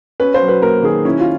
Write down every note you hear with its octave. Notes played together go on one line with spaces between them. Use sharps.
C#4 B4
C5
F#3
B4
A#3 A#4
D#3 G#4
C#4 E4
F4